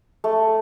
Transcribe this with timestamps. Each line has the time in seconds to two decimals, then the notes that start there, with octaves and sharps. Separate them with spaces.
0.24 A3